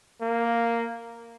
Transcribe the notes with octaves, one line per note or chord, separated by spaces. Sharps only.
A#3